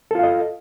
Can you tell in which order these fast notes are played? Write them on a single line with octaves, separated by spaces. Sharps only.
A4 F4 F5 D#5